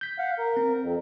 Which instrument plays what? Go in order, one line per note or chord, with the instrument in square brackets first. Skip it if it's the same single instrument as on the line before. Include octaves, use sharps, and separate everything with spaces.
[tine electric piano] G6 B6
[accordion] F5 F#5
A#4
[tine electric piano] C4
[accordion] F2